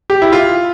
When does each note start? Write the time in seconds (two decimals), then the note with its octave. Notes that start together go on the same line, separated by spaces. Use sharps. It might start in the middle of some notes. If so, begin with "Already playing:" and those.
0.10 G4
0.22 E4
0.32 F4